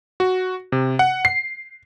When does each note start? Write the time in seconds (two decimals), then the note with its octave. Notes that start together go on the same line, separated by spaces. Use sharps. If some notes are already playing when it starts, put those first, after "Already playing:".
0.20 F#4
0.72 C3
0.99 F#5
1.25 C7